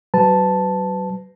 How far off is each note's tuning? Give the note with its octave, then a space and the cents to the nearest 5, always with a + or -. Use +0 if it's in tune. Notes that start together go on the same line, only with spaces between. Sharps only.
F#3 +35 B4 +25 A5 +0